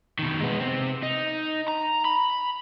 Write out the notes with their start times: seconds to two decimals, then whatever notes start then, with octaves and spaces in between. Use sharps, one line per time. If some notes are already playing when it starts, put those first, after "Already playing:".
0.19 B2 D#3
0.40 G#3 B3
0.60 C3 C4
1.03 D#4
1.68 A#5
2.05 B5